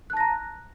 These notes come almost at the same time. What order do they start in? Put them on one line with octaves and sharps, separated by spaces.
F#6 A5 A#6 A#5